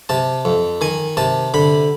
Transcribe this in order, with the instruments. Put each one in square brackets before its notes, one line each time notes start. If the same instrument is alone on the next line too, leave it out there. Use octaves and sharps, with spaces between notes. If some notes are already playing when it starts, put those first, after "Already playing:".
[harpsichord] C3 A5
F2
D#3 G#5
C3 A5
D3 B5